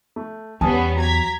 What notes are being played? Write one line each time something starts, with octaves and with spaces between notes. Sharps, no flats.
A3
E2 G3 B3 C#4 G#5 A5 D#6
F#3 A#5 G#6 B6